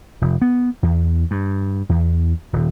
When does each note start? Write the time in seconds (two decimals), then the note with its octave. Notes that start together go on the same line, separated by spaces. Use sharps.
0.22 F1
0.42 B3
0.83 E2
1.31 G2
1.89 E2
2.53 D#1